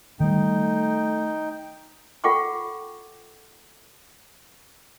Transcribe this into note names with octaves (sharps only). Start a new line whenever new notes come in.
D#3 G3 A3 D#4 G5
F4 A4 F#5 G5 C#6 D6